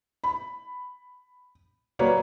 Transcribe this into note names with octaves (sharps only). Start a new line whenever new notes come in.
B5
F#3 A#3 B4 C#5 D5